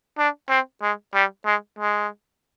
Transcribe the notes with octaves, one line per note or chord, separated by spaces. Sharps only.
D4
C4
G#3
G3
G#3
G#3